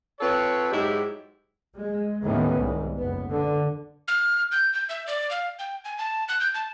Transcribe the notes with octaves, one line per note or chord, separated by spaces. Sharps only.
C4 F4 A4 B4 C#5
G#2 F#3 G#3 E4 G4
G#3
D#2 A2 D#3 E3 B3 C#4
C2 G#2
F#1 B3
D3
F6
G6
G6
E5
D5
F5
G5
G#5
A5
F#6
G6
A5